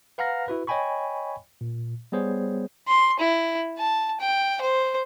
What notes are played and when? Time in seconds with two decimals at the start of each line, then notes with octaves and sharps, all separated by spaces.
0.18 B4 F5 F#5 A#5 F6 A#6
0.48 E4 F#4 B4
0.67 C#5 D#5 G5 G#5 B5 C#6
1.61 A#2
2.12 G3 B3 G#4 C5 C#5
2.88 C6
3.19 E4
3.78 A5
4.20 G5
4.61 C5